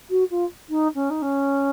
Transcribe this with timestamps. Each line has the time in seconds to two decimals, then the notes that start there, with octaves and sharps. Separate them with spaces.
0.10 F#4
0.31 F4
0.70 D#4
0.95 C#4
1.10 D#4
1.22 C#4